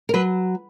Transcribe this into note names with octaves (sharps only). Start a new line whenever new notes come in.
A#4
F#3 B4